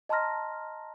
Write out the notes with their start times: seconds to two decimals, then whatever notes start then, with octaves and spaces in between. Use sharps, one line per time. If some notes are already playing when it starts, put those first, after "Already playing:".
0.09 D#5 A5 A#5 C6 F6 A#6